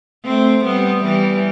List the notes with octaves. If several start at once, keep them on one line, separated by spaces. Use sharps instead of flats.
A3 C4
G3 B3
E3 G3